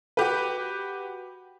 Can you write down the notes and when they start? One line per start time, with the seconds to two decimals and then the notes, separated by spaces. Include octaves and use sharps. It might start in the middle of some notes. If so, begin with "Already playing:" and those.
0.17 F#4 G4 B4